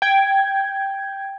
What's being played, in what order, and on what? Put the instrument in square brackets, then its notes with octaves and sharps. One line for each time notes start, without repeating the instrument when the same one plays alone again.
[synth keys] G5 G#6